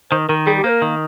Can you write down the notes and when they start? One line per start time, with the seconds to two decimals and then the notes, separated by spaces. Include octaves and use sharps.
0.11 D#3 C5
0.29 D#3 A#4
0.47 G3 G#4
0.58 G4
0.64 A#3 C5
0.69 A#4
0.82 D#3